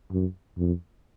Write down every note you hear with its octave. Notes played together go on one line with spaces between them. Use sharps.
F#2
F2